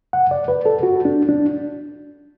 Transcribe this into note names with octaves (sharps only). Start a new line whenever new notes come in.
F#5
D5
B4
A4
F#4
D4
D4